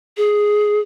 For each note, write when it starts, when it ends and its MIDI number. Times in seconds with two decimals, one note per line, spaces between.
0.17 0.80 68